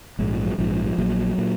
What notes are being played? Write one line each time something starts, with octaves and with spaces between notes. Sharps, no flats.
A#1 G#2 G#3
F3
F#3
A#1 G#2 F3
F3
F3
A#1 A#2 F#3
A#2